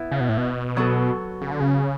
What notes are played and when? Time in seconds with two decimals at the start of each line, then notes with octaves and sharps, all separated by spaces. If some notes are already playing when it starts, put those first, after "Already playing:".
Already playing: B3 E4
0.11 C#3
0.20 B2
0.29 A2
0.38 B2
0.77 F#3 B3 F#4 A4
1.41 C#3
1.51 D3
1.60 C#3